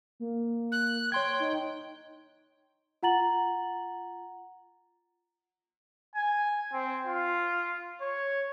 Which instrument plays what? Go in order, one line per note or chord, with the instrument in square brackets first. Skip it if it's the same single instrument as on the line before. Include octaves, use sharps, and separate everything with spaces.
[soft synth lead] A#3
[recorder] F#6
[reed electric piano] C#5 C6 G#6 [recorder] G5
[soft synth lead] D#4
[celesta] F4 F#5 A#5 A6 F#7
[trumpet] G#5
C4
F4
C#5